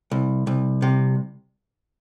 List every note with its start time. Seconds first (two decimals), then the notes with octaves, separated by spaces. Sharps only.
0.11 C2
0.47 C2
0.82 C3